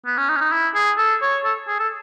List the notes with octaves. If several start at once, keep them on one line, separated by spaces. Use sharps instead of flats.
B3
C#4
D#4
C#4
D#4
E4
G#4
A4
C#5
A4
G#4
A4